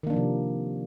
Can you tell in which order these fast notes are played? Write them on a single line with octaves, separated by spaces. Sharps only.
D#3 A#3 D4 F3 C3